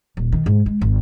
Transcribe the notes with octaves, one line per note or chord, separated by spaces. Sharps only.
D#1
D#3
G#2
G#3
G#1